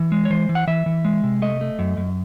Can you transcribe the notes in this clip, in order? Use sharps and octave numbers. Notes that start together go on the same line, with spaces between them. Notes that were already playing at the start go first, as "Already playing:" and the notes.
Already playing: E3
G#3
C#5
E3 C5
E3
F#5
E3 E5
E3
G#3
C3
A3 D#5
A3
F#2
F#2